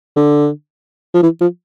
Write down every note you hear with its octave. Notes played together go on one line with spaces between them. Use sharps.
D3
F3
E3
F3